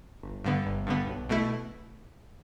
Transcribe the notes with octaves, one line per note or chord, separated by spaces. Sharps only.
G1
G2 D3 B3
G1
G2 D3 B3
B1
B2 A3 E4